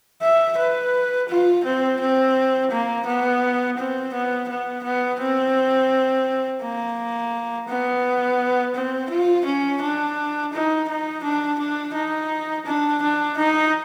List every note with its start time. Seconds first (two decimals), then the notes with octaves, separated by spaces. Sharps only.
0.22 E5
0.58 B4
1.29 F4
1.64 C4
2.00 C4
2.71 A#3
3.06 B3
3.77 C4
4.13 B3
4.49 B3
4.84 B3
5.20 C4
6.62 A#3
7.69 B3
8.75 C4
9.10 F4
9.45 C#4
9.82 D4
10.53 D#4
10.89 D#4
11.23 D4
11.59 D4
11.94 D#4
12.66 D4
13.02 D4
13.37 D#4